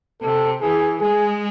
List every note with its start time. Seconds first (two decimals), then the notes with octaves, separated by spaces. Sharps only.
0.21 C3 A4
0.62 E3 G#4
1.01 G#3 G#4